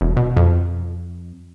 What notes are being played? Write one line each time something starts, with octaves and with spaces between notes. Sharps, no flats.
E1
B2
F2